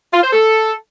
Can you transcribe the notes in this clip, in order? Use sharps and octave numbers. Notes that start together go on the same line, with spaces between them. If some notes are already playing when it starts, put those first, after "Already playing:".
F4
C5
A4